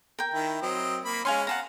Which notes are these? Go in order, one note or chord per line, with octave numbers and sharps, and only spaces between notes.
A#4 G5
D#3 E4
F#3 C4 D#5
A#3 B5
G#3 C#4 F5 G#5 C6
F5 F#5 A5 A#5